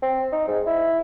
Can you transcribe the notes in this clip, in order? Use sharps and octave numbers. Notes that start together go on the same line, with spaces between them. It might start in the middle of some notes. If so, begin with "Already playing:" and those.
C4
D#4
G#2
E4